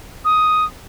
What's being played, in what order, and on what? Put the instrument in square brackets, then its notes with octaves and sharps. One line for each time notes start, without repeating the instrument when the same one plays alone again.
[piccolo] D#6